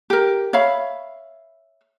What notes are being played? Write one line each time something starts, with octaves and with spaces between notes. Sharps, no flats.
G4 A#4
C#5 E5 F5 B5